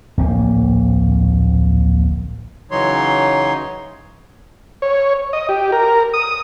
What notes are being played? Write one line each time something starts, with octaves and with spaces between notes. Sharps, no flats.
D1 A#1 A#3
C#3 E3 F#3 D#4 C#5 C6
C#5
D#5
G4
A#4
D#6